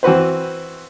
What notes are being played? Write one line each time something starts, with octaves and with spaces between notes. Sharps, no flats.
E3 C4 F#4 B4 C5